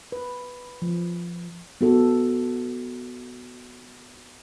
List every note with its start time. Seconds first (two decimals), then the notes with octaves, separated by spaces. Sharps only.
0.12 B4
0.82 F3
1.81 B3 F#4 A4